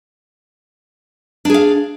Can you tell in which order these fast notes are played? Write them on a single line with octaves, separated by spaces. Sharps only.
D4 G#4 F5